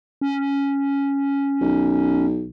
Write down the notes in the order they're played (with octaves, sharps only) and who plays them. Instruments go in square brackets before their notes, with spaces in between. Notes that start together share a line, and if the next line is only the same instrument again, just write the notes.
[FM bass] C#4
[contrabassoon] B1